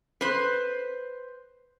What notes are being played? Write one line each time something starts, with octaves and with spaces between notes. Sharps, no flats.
B4 C5